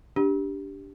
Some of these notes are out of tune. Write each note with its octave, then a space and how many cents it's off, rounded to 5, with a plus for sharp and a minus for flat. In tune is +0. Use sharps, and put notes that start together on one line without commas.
D4 -10 G4 +0